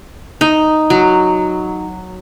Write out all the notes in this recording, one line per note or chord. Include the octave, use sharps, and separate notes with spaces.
D#4
F#3